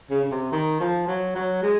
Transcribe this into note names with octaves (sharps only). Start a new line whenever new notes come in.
C#3
C#3
C3
D#3
F3
F#3
F#3
G#3